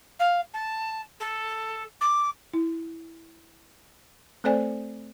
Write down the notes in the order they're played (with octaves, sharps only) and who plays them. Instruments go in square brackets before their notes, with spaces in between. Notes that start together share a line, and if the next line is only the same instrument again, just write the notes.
[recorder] F5
A5
A4
D6
[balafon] E4
A3 C4 A4 C5 D5 G#5